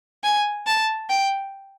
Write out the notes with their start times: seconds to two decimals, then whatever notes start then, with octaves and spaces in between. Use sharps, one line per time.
0.24 G#5
0.67 A5
1.09 G5